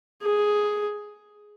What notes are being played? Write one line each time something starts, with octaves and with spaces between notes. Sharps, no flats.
G#4